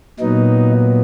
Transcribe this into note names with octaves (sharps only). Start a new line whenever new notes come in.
A#2 F#3 B3 D#4